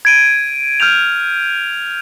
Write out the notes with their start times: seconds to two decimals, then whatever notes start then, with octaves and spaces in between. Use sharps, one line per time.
0.05 G#6 D7 D#7
0.80 F6 G6 G#6 F7